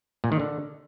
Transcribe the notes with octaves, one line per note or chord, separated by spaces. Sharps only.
A#2
D#3
D3